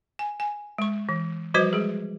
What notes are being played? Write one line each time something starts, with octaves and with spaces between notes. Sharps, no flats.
G#5
G#5
G#3 C#6
E3
F3 G3 F#4 B4 C5 D#5
G#3 G#4